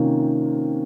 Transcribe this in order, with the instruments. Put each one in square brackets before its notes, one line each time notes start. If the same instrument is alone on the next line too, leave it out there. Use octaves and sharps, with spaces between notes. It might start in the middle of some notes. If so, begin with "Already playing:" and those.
Already playing: [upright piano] C3 D#3 A#3 C#4 F4